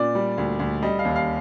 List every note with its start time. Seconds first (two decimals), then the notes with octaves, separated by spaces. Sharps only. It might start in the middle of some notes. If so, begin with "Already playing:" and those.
Already playing: A#2 D5
0.15 G3
0.38 D2
0.60 D2
0.83 G3 D#5
0.99 F5
1.05 D#2
1.16 F5